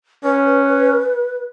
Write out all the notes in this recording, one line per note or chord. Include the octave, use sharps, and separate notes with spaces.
C#4 B4